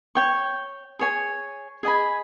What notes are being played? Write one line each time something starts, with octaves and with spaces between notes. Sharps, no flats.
C#5 G5 C#6
G#4 C#5 G#5
G#4 D#5 G#5 B5